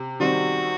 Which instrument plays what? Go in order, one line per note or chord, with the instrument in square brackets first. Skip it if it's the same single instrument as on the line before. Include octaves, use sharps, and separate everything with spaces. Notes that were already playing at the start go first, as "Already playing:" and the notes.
Already playing: [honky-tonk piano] C3
[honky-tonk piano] D#3 G3 C4 [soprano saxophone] F#4